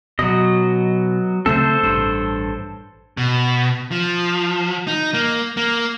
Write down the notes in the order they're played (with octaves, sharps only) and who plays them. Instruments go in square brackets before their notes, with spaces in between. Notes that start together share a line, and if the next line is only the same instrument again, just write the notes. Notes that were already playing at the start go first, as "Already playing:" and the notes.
[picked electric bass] B2 [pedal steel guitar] F#3 D#5
[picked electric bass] C#3 A3 C4 [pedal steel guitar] A4 C5
[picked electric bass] A1 G2
[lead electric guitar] B2
F3
D#4
A#3
A#3